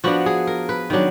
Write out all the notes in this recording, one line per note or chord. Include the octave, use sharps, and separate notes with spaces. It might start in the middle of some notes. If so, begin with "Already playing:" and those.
F3 B3 D4 F#4
G#4
A#4
B4
D#3 F#3 D4